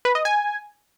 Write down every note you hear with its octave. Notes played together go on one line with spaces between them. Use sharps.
B4
D#5
G#5